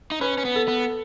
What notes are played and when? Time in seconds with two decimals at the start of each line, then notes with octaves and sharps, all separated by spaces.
0.12 D#4
0.21 C#4 B4
0.38 C#4
0.45 B3
0.56 A4
0.68 B3